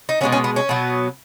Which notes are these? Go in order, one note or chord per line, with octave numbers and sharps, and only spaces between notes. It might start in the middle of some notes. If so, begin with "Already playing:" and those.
D#4
B2 G#3 B3 C#4
C#4
B3
C#4
B2 F#3 B3